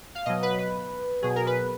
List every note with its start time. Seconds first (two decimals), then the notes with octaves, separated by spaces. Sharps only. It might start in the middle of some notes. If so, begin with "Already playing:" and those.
0.15 F5
0.26 B2 F#3 D#5
0.42 B4
0.58 B4
1.22 B2 F#3 G#4
1.36 A#4
1.47 B4